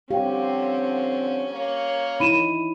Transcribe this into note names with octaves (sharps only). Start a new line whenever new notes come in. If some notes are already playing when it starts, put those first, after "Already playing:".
D3 F3 C4 C#4 G4 F5 G5
A#3 C#5
D#4 E4 B5 D#7 E7